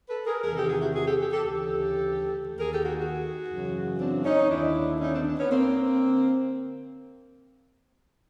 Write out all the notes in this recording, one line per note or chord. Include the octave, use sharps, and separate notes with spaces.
A4 B4
G#4 A#4
E2 C3 D#3 G#4 A#4
G4 A4
F#4 G#4
E4 F#4
F#4 G#4
G4 A4
G4 A4
G4 A4
D2 C#3 E3 G4 A4
D#2 D#3
G#4 A#4
G4 A4
F#4 G#4
F#4 G#4
F#2 C#3 E3
C4 D4
C#4 D#4
D#2 D3 D4 E4
C#4 D#4
C4 D4
C4 D4
B3 C#4
D3 A#3 C4